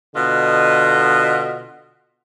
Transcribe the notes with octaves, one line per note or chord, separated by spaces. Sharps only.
B2 D3 F4 D#5